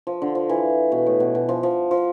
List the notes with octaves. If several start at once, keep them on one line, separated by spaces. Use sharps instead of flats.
F3
D3
F3
E3
B2
A2
B2
B2
F3
F3
F3